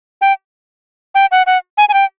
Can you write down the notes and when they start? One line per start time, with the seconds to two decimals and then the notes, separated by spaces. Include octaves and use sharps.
0.21 G5
1.15 G5
1.31 F#5
1.47 F#5
1.78 G#5
1.89 G#5
1.94 G5